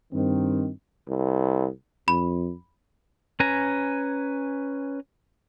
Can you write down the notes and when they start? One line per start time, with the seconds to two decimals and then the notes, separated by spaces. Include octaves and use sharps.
0.13 G2 D#3 C4
1.08 C2
2.08 F2 B5
3.40 C#4 B4 G#5 A#5